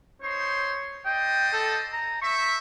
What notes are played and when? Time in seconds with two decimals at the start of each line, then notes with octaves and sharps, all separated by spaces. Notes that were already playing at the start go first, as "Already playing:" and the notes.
0.22 D#4 C5 C#5 C6
1.05 C5 D5 D#5 G5
1.53 A4
1.93 A#5
2.22 C5 E5 C#6